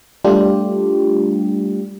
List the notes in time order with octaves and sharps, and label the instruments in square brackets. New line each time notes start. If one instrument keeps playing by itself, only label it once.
[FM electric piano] G3 A3 D4 F4 G4